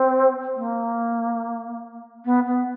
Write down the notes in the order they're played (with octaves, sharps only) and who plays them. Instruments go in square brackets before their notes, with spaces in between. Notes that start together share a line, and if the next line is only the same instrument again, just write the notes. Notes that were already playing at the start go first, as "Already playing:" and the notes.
Already playing: [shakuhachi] C4
A#3
B3
B3